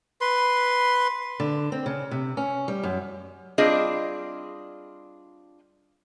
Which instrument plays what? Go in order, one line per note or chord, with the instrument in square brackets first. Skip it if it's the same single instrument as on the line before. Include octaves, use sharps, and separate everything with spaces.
[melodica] B4 C6
[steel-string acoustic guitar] D3
C4
C#3
C3
C#4
G3
F#2
[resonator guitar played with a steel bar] G3 C4 D4 F4 G#4 D#5